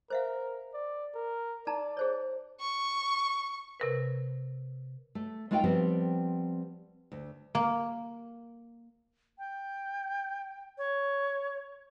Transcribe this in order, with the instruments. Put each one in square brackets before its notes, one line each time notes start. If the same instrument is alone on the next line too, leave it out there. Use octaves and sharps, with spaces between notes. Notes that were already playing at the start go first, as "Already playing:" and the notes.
[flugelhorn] A#4 [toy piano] C5 E5 F5
[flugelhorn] D5
A#4
[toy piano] D#4 A5 A#5 [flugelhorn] D5
[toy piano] G#4 C5 C#5
[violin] C#6
[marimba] C3 A#4 B4
[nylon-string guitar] A3
G#3 A3 D#4 F4 F5 G5
F3 G3 B3 C4
D2
[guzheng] A#3
[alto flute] G5
C#5